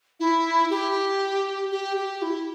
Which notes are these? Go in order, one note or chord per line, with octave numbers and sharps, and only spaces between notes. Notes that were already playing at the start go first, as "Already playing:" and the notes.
E4
G4
G4
G4
E4